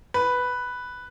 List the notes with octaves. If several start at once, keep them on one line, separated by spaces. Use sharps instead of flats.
B4